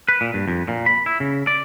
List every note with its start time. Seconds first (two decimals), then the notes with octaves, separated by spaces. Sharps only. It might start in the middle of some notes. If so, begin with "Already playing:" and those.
0.08 B4
0.21 A#2
0.34 G2
0.48 F2
0.68 A#2
0.86 B5
1.06 E4
1.20 C#3
1.47 D5